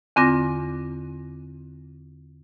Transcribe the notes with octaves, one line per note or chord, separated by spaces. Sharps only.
E2 D3 C4 F4 D6 A#6